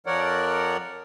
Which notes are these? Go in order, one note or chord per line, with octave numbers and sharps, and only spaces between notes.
F2 F3 A#4 C#5 D5 F#5